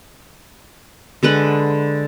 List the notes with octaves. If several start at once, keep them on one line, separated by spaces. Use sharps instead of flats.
D3 G#3 B4 F#5